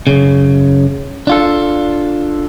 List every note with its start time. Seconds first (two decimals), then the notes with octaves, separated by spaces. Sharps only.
0.07 F#2 C#3
1.27 D4 F4 A4